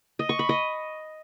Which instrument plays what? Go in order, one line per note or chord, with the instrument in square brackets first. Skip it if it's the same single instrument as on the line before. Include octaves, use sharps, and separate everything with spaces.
[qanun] D#5
C#6
B5
D#5